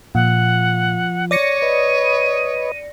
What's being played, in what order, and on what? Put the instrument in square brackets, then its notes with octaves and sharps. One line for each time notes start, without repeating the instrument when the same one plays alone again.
[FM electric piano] A#2 [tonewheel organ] F3 [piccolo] F#5
[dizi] C#5 [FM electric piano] D5 A#6 C#7 [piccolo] D#7
[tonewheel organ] B4 D#5